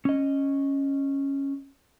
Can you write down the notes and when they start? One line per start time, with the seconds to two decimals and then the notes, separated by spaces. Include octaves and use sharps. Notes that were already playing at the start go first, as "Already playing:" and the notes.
0.05 C#4 D#5